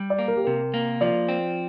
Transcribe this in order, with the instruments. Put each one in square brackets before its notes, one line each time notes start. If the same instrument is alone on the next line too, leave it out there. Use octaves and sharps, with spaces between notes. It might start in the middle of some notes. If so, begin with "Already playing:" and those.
Already playing: [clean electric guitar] G3
[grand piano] D5
[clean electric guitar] A#3
[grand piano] A#4
G4
[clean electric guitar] C3 [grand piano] A#4
[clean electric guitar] A#3
[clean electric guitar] F3 [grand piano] D5
[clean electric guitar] C4